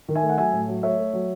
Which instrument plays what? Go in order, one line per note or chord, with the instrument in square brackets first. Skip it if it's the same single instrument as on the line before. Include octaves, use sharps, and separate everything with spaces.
[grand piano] D#3
E5 G#5
A3
F#5
F#3 E5 G#5
A2
F#3
A3 C#5 E5
A3
F#3